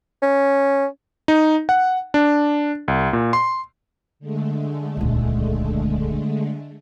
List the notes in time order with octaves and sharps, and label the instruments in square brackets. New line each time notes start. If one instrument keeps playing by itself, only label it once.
[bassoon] C#4
[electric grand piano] D#4
F#5
D4
C2
A#2
C6
[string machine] D3 G#3 A3
[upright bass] D#1 C#2